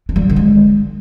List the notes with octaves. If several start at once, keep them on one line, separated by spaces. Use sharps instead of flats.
D4
G3
E3
D3
G#3